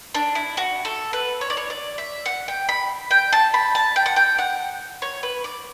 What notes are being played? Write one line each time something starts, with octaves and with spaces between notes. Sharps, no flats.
D4
E4
F#4
A4
B4
C#5
D5
C#5
D5
E5
F#5
G5
B5
G5
A5
B5
A5
G5
F#5
G5
F#5
C#5
B4
D5